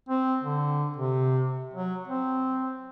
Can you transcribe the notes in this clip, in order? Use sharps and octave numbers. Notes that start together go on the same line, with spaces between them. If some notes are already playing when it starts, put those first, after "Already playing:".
C4
D3
C3
F#3
C4